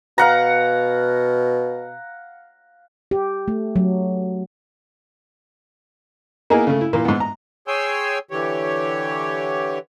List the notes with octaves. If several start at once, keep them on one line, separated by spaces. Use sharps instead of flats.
B2 F5 F#5 A#5
G4
A3
F#3
A#3 B3 D#4 E4 G#4 A#4
C#3 A3
E4
A#2 E3 A#3
G#2 B3
A#5
G#4 C#5 G5 G#5 C6 E6
D3 E3 G4 C#5